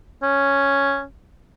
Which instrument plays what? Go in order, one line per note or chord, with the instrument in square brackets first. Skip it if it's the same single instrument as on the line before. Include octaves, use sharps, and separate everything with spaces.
[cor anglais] C#4